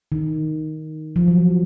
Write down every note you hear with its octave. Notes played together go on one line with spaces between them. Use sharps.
D#3
F3
F#3